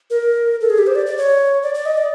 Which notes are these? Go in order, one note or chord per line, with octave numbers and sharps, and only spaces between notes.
A#4
A4
G#4
G4
C5
D5
D5
C#5
D5
D5
D#5
D5